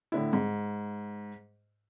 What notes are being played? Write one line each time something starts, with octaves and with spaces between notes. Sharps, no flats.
A2 D3 E4
G#2